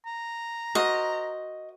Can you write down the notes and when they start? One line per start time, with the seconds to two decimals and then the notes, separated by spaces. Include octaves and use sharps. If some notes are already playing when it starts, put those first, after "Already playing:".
0.06 A#5
0.75 F#4 A#4 C5 D#5